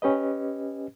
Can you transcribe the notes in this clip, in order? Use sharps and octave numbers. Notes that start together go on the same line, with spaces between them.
C#4 G4 B4 D#5